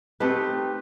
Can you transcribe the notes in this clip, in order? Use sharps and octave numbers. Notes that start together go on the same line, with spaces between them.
A3 C4 D#4 G4 B4